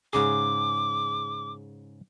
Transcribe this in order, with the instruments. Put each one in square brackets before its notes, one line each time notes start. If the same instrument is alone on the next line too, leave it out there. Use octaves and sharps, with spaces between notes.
[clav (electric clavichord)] G#2 C#3 G#4 [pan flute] D6